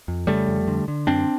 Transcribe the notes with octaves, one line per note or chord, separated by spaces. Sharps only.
F2
C#3 G3 A3
F2
D3
D3
F#2 C4 D4